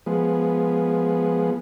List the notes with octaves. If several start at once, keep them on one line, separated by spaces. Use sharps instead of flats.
F3 G#3 B3